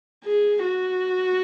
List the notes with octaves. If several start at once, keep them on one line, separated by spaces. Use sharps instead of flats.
G#4
F#4